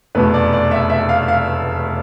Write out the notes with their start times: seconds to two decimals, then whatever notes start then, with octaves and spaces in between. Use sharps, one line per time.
0.15 F1 E2 B2 B4
0.34 D5
0.53 D5
0.71 E5
0.90 E5
1.09 F5
1.28 F5